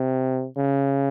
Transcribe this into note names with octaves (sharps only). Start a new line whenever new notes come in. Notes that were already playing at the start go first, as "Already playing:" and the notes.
Already playing: C3
C#3